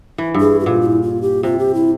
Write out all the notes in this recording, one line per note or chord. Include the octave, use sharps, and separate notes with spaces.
E3
G2
G#4
G4
A#2 F4
F4
E4
F4
G4
C3 F4
G4
E4